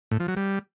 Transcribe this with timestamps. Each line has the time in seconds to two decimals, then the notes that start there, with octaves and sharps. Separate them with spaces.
0.11 A2
0.20 F3
0.28 F#3
0.37 G3